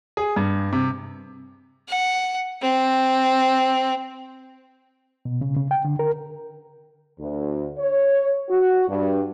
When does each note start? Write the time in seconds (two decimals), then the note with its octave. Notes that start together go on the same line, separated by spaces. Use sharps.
0.17 G#4
0.36 G2
0.73 C3
1.88 F#5
2.62 C4
5.25 B2
5.41 C#3
5.57 C#3
5.71 G5
5.85 D3
5.99 A#4
7.20 D2
7.79 C#5
8.49 F#4
8.89 G2